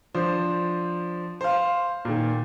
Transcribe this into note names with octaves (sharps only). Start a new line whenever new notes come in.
F3 D4 C5
C5 F5
A#2 D#3